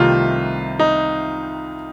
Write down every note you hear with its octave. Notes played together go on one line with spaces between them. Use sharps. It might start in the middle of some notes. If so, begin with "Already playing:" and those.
Already playing: C2 C3 D#3 A3 F4
D#4